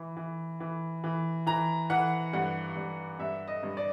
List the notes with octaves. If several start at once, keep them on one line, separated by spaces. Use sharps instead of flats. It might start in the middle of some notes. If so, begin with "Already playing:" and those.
Already playing: E3
E3
E3
E3
E3 A#5
E3 F#5
G2 F#5
G2
G2 E5
D#5
G2
D5